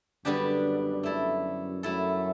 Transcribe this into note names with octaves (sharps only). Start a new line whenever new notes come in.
F#2 D3 G3 B3 D4 G4
A3 E4 A4
F#2 A3 E4 A4